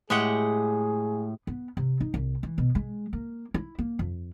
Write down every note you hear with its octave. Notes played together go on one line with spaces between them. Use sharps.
A2 G#3 G4 G#4 F#5
B3
C3
D#4
C2
E3
B2
G#3
A#3
E4
A#3
F2